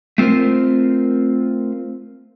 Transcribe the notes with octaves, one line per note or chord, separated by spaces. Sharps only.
A3 C4 F4 A#4 C5